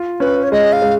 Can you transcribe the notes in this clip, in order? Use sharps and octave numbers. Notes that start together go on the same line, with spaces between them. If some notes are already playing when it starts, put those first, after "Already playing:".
Already playing: F4
C#4 B4
C#5
G#3 D#5
F5
G#3